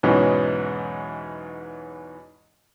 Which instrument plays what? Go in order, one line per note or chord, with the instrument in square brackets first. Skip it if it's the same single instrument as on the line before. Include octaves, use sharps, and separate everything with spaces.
[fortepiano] E2 G#2 B2 E3 F#3 C#4